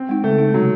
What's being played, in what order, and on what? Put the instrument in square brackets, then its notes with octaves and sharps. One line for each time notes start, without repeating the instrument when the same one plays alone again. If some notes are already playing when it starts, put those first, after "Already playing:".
Already playing: [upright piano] C4
[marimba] G#3 D#4
[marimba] C#3 [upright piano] A3
[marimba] G#3 D#4
[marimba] C3 [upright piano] F#3